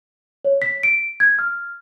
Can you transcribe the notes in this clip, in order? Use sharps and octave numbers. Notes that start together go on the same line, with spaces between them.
C#5
B6
D7
G#6
F6